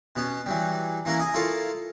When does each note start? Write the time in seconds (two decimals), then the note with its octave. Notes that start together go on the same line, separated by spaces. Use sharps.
0.16 B2 B3 C#4
0.46 E3 F#3 G3
1.05 E3 A#3 C#4 E4 A#4
1.19 G#4 D#5
1.34 E4 F4 A4 A#4 C#5 F5